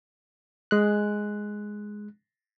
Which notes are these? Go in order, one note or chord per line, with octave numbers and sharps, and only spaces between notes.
G#3 F#6